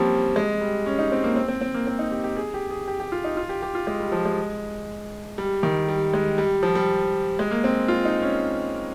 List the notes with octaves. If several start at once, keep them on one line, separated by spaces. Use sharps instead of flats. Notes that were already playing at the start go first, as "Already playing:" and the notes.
Already playing: F3 G3 A#3 C4 C#4
G#3
G3
C#4
D#4
C4
A#3
C4
C4
C4
A#3
C4
D#4
G4
G4
G#4
G4
G#4
G4
G4
F4
D#4
F4
G4
G4
F4
G#3
G3
F3
G#3
G3
D#3
G3
G#3
G3
F3
G3
G#3
A#3
C4
F4
D#4
C#4